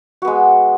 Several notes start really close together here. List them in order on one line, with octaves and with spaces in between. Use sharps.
F#4 B3 G#3